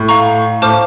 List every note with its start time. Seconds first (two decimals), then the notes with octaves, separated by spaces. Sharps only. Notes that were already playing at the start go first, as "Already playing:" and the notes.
Already playing: A2
0.08 F5 A#5 C#6
0.62 A2 C5 F5 A5 D6 F6